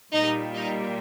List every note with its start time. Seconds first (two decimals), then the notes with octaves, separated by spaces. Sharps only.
0.13 A#2 G3 D#4
0.54 D#4